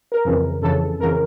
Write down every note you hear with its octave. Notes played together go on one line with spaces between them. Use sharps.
A#4
F2 C#3 E3
F2 C#3 E3 A4
F2 C#3 E3 A#4